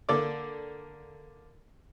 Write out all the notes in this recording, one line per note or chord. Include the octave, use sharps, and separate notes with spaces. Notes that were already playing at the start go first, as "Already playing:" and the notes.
D3 A#3 D5 D6